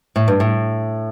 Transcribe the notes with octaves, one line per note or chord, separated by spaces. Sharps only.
A2
G2
A2